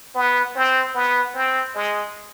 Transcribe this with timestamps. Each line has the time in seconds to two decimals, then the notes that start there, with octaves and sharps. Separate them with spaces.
0.14 B3
0.55 C4
0.94 B3
1.34 C4
1.75 G#3